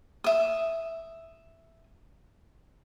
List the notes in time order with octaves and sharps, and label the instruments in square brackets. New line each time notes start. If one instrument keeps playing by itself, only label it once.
[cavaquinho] E5 D#6